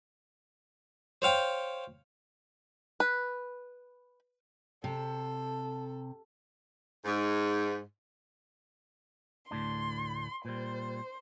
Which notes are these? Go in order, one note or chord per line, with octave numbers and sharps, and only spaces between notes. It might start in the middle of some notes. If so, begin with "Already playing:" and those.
C5 C#5 F5 G5
B4
C3 A4
G#2
D2 A2 D4 C6
A#2 G3 C5